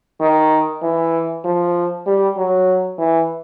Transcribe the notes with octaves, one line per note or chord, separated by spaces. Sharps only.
D#3
E3
F3
G3
F#3
E3